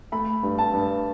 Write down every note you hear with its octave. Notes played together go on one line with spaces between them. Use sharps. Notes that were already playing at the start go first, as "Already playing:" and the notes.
A3 B5
G2
A5
G2